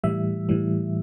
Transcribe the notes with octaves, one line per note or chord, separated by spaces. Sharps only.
A2 E3 G3 E5
A2 E3 G3